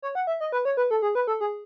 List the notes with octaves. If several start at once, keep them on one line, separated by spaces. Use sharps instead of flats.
C#5
F#5
E5
D#5
B4
C#5
B4
A4
G#4
B4
A4
G#4